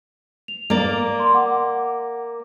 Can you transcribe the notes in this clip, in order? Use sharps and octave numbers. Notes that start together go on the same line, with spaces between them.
F7
A#3 D5
C6
F#5 D6